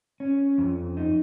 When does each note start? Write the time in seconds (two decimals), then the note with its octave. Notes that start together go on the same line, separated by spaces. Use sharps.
0.20 C#4
0.58 F2
0.97 D#4